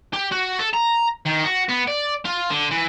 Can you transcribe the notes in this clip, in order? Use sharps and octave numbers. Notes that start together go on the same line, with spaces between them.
G4
F#4
A4
A#5
D#3
F#4
B3
D5
F4
D3
E3